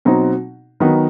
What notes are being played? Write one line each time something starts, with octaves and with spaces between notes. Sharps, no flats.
B2 F#3 C4 D#4
D#3 F#3 B3 D#4